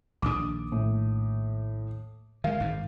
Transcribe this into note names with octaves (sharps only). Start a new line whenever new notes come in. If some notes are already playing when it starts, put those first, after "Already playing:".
A#1 D#2 D4 D6 D#6
A2
D#3 G#3 F5
G#1 G#2